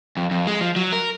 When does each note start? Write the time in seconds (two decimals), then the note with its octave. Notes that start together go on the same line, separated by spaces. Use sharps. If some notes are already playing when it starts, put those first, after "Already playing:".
0.17 F2
0.31 F2
0.47 G#3
0.61 F3
0.76 F#3
0.92 A#4